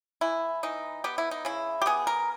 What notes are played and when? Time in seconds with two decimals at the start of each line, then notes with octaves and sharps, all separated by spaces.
0.21 E3 E4
0.63 E3 D#4
1.04 B3 G4
1.18 E4
1.31 D#4
1.45 C#3 E4
1.82 G4
1.86 B3 G#4
2.07 A#4